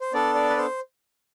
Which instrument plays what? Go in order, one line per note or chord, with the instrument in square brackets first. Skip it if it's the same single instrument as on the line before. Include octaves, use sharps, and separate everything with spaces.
[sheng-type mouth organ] C5
B3 D4 A4 D5
D5
B4
C5